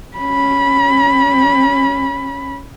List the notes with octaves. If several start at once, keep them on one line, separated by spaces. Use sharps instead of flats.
C#4 B5